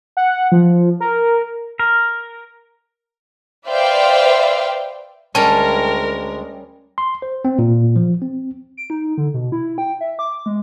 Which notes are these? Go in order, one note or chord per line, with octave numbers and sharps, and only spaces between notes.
F#5
F3
A#4
A#4
B4 C5 D5 E5 F5 G5
D2 G3 G#3 C#4 A#4 A5
C6
C5
C4
A#2
F3
C4
D7
D#4
D3
B2
E4
G5
E5
D6
G#3